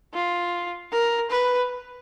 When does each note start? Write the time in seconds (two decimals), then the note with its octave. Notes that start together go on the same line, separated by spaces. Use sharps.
0.14 F4
0.92 A#4
1.30 B4